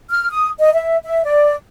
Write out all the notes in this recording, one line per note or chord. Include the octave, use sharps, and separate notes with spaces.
F6
D#6
D#5
E5
E5
D5